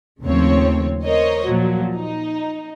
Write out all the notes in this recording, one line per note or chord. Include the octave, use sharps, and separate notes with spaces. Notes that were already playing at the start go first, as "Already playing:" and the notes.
D#2 A2 C#3 F3 C4 C#5
A#4 C5 C#5 D#5
A#2 F3 F#3
D#4